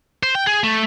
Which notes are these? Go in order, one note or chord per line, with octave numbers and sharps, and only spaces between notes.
C5
G5
G#4
A3